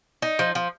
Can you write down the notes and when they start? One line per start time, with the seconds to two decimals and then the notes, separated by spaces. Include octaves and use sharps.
0.22 D#4
0.39 F3
0.55 F3